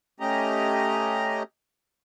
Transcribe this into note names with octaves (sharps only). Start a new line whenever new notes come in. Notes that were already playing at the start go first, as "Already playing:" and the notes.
A3 C#4 G4 D#5 A#5